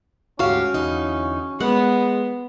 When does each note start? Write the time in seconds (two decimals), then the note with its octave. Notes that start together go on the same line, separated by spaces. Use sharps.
0.39 D2 G#2 C#4 F#4 G4 F5
0.74 E2 D3 D#4
1.60 G#3 B3 F#5